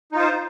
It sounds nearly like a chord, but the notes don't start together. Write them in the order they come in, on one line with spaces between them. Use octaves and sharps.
D#4 F4 C5